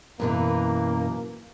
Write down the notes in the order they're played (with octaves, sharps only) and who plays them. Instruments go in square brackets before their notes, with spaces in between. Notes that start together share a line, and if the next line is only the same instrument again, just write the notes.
[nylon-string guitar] F#2 B2 E3 [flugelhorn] A#3